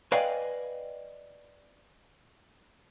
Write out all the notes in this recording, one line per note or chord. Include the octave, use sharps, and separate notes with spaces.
B4 D5 D#5 F5 G5 G#5